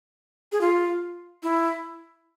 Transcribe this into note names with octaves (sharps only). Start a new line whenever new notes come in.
G#4
F4
E4